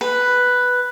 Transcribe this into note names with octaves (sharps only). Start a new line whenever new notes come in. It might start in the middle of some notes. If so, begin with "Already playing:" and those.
B4